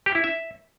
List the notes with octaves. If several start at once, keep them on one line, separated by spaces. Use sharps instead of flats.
G4
E4
E5